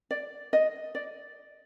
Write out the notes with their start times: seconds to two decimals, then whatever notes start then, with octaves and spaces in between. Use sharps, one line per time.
0.11 D5
0.53 D#5
0.95 D5